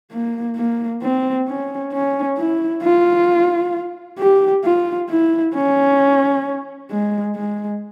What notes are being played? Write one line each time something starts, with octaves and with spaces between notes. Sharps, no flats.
A#3
A#3
C4
C#4
C#4
E4
F4
G4
F4
E4
C#4
G#3
G#3